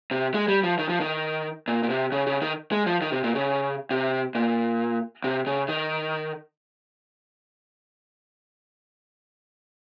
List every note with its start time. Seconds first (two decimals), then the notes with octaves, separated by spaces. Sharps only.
0.11 C3
0.34 G#3
0.48 G3
0.63 F3
0.79 D#3
0.89 F3
1.00 D#3
1.68 A#2
1.83 A#2
1.90 C3
2.12 C#3
2.27 C#3
2.42 D#3
2.72 G#3
2.86 F3
3.01 D#3
3.12 C3
3.24 A#2
3.35 C#3
3.91 C3
4.35 A#2
5.24 C3
5.47 C#3
5.69 D#3